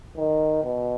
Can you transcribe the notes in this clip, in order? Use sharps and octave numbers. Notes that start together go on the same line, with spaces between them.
D#3
B2